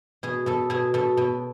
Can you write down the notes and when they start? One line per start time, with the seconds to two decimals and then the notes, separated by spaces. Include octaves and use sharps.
0.23 B2 G#4
0.46 B2 A4
0.70 B2 G#4
0.94 B2 A4
1.17 B2